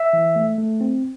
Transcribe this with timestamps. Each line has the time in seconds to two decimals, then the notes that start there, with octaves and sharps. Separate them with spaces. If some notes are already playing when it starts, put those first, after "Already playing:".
Already playing: E5
0.13 E3
0.36 A3
0.58 A3
0.81 C4